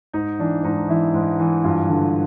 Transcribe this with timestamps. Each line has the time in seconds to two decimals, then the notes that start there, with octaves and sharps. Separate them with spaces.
0.13 G#2 D#4
0.39 E3 D4
0.63 G#2 D#4
0.89 E3 E4
1.14 G#2
1.39 E3
1.64 G2 F4
1.89 D3